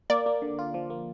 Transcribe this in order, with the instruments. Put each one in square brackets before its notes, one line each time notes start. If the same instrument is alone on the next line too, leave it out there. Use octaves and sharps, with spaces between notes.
[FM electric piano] A#3 [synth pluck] D5
[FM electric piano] A#3
D3
F4
F3
A#3